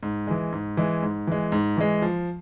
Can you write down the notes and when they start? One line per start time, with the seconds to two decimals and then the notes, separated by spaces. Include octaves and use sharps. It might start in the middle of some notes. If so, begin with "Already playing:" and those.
0.03 G#2
0.27 E3 G#3
0.53 G#2
0.77 E3 G#3
1.02 G#2
1.27 E3 G#3
1.52 G#2
1.77 E3 G#3
2.02 F3